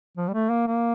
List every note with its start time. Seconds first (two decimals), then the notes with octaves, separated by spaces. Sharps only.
0.17 F3
0.28 G3
0.34 A3
0.50 A#3
0.67 A#3